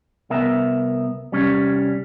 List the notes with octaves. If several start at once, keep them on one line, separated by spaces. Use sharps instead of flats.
C2 B3 A#4 E5
C2 G3 C#4